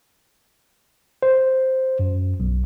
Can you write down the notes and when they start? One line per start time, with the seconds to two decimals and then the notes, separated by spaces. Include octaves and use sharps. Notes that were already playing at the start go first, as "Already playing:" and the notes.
1.23 C5
1.99 F#2
2.40 B1